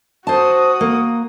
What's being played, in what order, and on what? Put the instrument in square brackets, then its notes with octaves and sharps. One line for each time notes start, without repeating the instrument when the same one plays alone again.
[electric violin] F#4 D#6 [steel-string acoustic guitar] C5 A5
[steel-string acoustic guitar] A#3